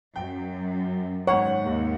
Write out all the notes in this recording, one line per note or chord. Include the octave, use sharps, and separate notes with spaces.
F#2 G5
G#2 D#3 C#5 F#5
D#2